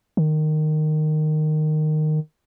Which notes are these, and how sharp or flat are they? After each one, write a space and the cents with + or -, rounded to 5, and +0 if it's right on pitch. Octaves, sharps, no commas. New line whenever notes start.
D#3 -15